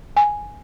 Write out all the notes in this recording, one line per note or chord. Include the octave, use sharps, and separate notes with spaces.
G#5